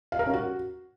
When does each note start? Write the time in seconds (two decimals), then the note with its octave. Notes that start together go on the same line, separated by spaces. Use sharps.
0.12 F5
0.19 A#4
0.26 C#4
0.33 F#4